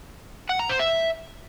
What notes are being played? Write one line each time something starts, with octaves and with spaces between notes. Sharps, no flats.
F#5
A#5
C5
E5